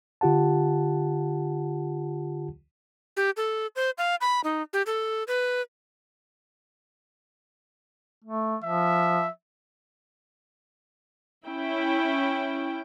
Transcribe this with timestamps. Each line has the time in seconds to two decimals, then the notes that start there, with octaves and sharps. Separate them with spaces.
0.21 D3 F4 G4 F#5 A5
3.17 G4
3.37 A4
3.76 C5
3.98 F5
4.21 B5
4.44 D#4
4.73 G4
4.86 A4
5.28 B4
8.24 A3
8.63 F3 E5
11.46 C#4 E4 G5